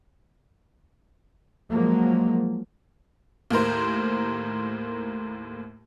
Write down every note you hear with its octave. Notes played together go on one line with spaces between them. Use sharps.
F3 F#3 G#3 A#3
D#2 A2 A#4 C5